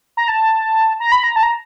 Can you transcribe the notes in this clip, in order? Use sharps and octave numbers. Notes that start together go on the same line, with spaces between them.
A#5
A5
A#5
B5
A#5
A5
A#5